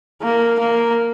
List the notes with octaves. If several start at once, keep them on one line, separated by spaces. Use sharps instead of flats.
A#3
A#3